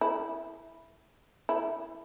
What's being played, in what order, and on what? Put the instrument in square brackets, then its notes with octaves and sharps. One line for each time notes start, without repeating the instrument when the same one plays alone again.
[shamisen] E4
E4